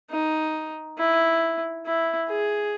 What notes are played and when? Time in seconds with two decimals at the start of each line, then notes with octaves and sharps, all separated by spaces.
0.11 D#4
0.98 E4
1.86 E4
2.29 G#4